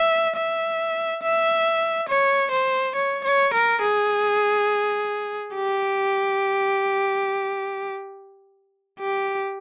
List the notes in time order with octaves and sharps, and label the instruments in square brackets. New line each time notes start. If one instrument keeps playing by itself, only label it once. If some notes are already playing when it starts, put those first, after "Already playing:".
Already playing: [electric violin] E5
E5
E5
C#5
C5
C#5
C#5
A#4
G#4
G4
G4